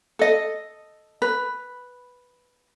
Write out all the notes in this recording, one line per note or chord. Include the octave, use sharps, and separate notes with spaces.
A4 D#5
B4